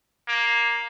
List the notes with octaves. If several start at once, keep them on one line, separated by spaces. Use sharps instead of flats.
A#3